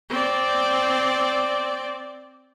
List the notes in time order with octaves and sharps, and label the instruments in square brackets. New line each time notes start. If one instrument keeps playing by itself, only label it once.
[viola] C4 D5